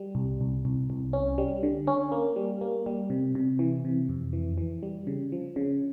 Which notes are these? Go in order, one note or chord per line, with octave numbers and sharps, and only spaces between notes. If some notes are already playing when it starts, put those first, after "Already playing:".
Already playing: G3
C2
C2
C2
C2
C#4
G3
D3
C#4
A#3
G3
A#3
G3
C3
C3
E3
C3
F2
E3
E3
G3
C#3
F3
C#3